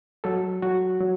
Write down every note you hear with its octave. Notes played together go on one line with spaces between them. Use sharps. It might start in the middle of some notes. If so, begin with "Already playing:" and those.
F#3 A4
F#3 F#4
F#3